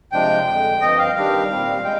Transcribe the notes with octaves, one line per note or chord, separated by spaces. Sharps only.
C3 F3 G#3 D4 G5
F2 D3 G#3
G2 F3 C4 D#5
F5
D#3 G3 D4 G4 F5
A#2 G3 C4
G#3 G5